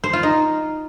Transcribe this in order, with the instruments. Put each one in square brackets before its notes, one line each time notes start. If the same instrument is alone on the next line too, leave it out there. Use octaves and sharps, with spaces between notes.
[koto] C5
F4
D#4